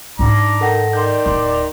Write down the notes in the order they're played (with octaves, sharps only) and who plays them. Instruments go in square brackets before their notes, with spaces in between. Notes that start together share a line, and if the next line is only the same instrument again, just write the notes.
[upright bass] G#2 D#4 [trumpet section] D4 A#5 D6
[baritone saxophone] D#3 [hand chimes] A4 F#5 A#6
[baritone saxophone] D#3 [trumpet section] D5 [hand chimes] C6 G6
[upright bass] D1 [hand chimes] C6